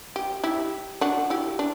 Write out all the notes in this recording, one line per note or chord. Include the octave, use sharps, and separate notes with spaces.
G4
E4 G4
D4 F#4
E4 G4
D4